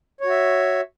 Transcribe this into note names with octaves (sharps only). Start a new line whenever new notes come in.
F#4 C#5 E5